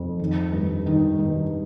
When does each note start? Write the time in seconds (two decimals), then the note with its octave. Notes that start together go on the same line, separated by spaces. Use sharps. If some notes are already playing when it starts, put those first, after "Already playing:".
Already playing: F2
0.19 D#3
0.53 G2
0.86 D#3 D#4
1.19 G2